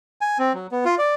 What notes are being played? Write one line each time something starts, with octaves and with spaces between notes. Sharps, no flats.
G#5
C4
F#3
B3
F4
D5